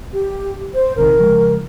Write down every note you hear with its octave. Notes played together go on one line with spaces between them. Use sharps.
G4
C5
A#1 C3 D#3 A#4
C#3 F3 G#3